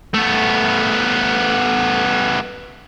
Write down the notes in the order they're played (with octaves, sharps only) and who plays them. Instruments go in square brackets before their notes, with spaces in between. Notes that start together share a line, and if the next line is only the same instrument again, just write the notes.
[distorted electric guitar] A3 B3